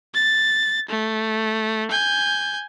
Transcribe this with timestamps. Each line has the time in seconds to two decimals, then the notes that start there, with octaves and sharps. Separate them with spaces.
0.15 A6
0.89 A3
1.91 G#5 G6